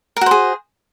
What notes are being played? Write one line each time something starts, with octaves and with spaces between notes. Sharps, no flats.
F#4 G#4 A#4 C5